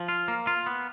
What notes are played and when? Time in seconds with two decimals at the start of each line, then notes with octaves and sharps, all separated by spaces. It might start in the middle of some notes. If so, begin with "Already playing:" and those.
Already playing: F3
0.08 F4
0.28 A#3
0.47 F4
0.67 B3